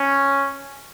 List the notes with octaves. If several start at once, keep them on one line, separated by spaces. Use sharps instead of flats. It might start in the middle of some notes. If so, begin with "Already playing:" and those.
Already playing: C#4